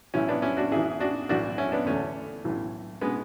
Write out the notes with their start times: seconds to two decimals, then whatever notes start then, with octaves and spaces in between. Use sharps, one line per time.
0.14 B1 A2 E3 C#4 E4
0.28 B3 D4
0.42 C#4 E4
0.57 D4 F#4
0.72 G#1 G#2 E3 E4 G#4
1.00 D4 F#4
1.29 B1 A2 E3 D4 F#4
1.58 C#4 E4
1.72 B3 D4
1.86 E2 D3 A3 C#4
2.44 B1 A2 E3
3.01 B2 G#3 B3